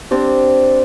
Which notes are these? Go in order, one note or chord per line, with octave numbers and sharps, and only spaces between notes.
C4 D4 G4